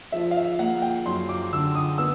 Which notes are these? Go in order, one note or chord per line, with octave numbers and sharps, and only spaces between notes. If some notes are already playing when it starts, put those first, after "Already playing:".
F3 E5
F5
E5
A#3 F#5
G5
F#2 C6
D6
D3 E6
D#6
B3 E6